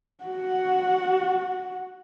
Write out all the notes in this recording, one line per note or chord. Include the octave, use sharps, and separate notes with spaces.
F#4 F#5